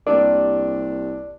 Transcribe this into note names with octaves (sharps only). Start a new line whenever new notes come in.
C2 A#3 D4 G4 A#4 D5